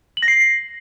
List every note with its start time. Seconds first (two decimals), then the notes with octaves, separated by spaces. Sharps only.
0.17 F#7
0.22 A#6
0.28 C7